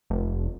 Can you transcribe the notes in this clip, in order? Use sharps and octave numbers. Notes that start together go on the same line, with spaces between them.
F1